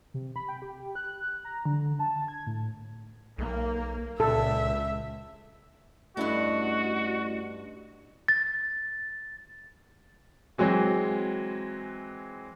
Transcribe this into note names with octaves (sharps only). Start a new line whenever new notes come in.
C3
B5
G5
G4
F#6
A#5
D3
A5
G#6
A2
B1 A#3
C#2 A#2 A4 E5
G2 A3 C#4 D4 E4 F#4 D#5
A6
E3 F#3 G#3 C4